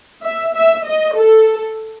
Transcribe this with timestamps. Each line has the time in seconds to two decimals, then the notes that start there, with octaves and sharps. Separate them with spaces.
0.23 E5
0.54 E5
0.85 D#5
1.15 A4